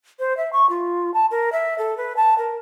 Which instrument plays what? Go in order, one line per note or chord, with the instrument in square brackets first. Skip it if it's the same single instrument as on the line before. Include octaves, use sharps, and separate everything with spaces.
[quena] C5
E5
C#6
F4
A5
A#4
E5
A4
B4
A5
A#4